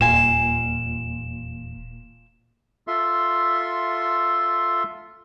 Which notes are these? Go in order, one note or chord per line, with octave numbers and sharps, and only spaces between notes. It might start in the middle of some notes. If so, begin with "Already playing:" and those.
D#1 E2 A#2 F4 G#5 E7
F4 A4 E5 C6